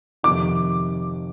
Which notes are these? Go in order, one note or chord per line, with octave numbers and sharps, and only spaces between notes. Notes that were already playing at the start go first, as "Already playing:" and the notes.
F2 C3 D#3 D6